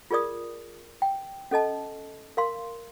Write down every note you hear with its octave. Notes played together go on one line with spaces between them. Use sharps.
F4 G#4 A#4 D5 D#6
G5
C#4 A4 D#5 A5
A#4 F5 C6